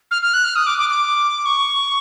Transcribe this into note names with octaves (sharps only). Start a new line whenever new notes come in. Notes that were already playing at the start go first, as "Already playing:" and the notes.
F6
F6
F#6
F6
D#6
D6
D6
D6
C#6